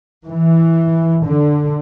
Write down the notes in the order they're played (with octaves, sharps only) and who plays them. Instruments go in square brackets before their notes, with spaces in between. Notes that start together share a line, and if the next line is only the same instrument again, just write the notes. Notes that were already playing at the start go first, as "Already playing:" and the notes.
[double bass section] E3
D3